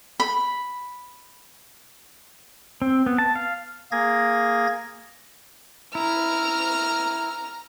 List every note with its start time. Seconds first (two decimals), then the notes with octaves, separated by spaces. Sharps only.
0.20 B5
2.82 C4
3.06 B3
3.18 A5
3.35 F5
3.92 A#3 G#4 G#6 A#6
5.95 E4 A#5 F6